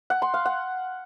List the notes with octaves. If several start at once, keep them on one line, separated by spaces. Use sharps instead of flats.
F#5
C6
F5
F#5